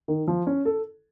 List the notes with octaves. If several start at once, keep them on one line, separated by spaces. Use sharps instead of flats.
D#3
F3
C#4
A4